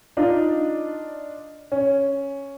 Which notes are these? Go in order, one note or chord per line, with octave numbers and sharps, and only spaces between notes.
D4 D#4 F4
C#4